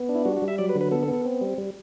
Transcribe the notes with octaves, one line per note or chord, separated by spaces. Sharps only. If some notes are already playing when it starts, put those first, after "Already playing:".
Already playing: B3
D4
E4
G3 F#4
F#4
G3
E5
F#3 D5
B4
D3
B4
B3 A4
A4
B3
A4
C4
G3
G3